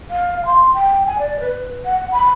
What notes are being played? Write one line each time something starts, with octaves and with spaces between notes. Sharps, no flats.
F5
C6
G5
G#5
D5
B4
F#5
B5